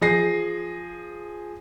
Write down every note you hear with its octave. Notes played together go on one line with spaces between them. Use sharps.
F3 G#4 A#6 C7